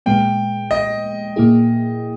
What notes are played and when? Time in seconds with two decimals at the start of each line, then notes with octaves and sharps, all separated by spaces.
0.06 A#2 G#3 B3 G5
0.71 D#5
1.36 A#2 A#3 E4 G#4